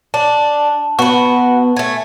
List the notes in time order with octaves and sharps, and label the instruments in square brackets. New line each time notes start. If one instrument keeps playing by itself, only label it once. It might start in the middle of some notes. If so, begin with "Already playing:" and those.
[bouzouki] D4 [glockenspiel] A5
[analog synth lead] B3 [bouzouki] F#4 B4 [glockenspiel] C#6
[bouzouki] A3 G#5